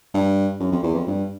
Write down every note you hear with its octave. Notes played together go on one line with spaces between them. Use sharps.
G2
F#2
F2
E2
F2
G2